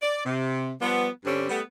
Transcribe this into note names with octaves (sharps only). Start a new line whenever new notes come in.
D5
C3
F3 G3 B3
G2 D3 G3 C4 C#4
G3 A3 B3